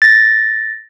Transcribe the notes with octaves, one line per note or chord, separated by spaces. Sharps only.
A6 A#6